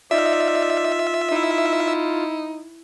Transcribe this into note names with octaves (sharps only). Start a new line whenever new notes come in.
D#4 F4 D5 E5
D#4 E4